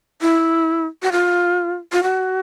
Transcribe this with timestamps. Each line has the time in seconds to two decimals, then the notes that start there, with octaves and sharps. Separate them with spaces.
0.21 E4
1.03 F#4
1.12 F4
1.93 F4
2.03 F#4